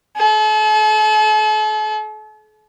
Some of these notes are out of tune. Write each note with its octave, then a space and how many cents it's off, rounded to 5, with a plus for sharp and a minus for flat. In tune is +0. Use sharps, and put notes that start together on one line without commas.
A4 -45